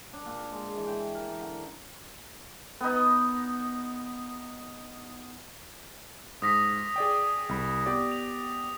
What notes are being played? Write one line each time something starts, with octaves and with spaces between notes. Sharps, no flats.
D4
A#2
G#3
E3
G5
A#4
D3
B3 D#4
G#2 D#6 A#6 B6
G#4 D5 G5
C2 B5
B3 G4 D5
F7